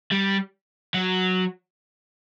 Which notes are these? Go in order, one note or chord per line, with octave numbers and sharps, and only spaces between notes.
G3
F#3